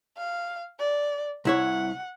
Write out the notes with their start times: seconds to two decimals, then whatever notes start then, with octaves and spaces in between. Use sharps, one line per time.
0.17 F5
0.79 D5
1.45 C2 E4 C#5 F#5